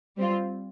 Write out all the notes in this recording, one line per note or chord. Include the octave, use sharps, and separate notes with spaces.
G3 C4 F4